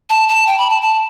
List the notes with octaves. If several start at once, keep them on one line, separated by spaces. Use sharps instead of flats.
A5
A5
G5
B5
A5
A5